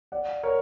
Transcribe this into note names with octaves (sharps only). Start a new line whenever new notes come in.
D5 F#5
A#4 C#5